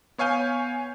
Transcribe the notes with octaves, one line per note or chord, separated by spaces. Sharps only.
B3 C#5 F5 G#5 G6